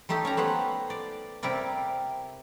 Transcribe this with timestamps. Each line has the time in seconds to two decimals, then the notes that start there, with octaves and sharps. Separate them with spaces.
0.09 G3 A3 D#4 G4 A4
0.25 C#4 G4 A#5
0.37 A3 B3 C5 F#5
0.90 D5
1.43 C3 G3 E4 A#4 D5